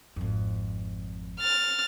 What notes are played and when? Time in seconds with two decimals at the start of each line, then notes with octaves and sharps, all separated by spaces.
0.16 G#1 F2
1.40 F6 A6